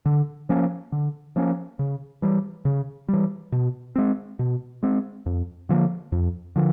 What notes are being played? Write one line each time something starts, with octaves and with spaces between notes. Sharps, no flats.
D3
F3 A#3 C#4
D3
F3 A#3 C#4
C#3
E3 G3
C#3
E3 G3
B2
G#3 C4
B2
G#3 C4
F2
D3 F3 A#3
F2
D3 F3